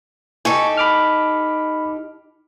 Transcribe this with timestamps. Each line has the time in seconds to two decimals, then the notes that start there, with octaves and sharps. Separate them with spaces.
0.45 D#4 G4 A4 G#5 C#6
0.78 B5 D6 F6